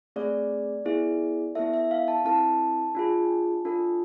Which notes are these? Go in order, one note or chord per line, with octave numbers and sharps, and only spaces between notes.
A3 C4 G#4 D5
B3 E4 G#4
B3 E4 A4 E5
E5
F5
A5
C4 E4 A4 A5
D4 F4 G#4
D4 F4 A4